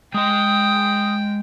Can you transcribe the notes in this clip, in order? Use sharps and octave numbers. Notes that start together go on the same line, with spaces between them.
G#3 D#5 G5 D#6